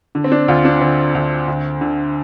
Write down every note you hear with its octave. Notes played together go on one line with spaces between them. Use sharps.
D3
C4
D4
D2 F4
D4
D3 C4
D2
D2
D3